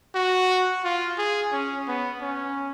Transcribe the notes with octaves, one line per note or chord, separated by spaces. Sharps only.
F#4
F4
G#4
C#4
B3
C#4